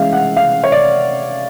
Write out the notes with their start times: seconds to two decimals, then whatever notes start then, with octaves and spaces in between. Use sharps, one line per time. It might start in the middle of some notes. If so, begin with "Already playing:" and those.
Already playing: E3 G#3 C#4 E5 F5
0.13 F#5
0.37 F5
0.64 C#5
0.72 D5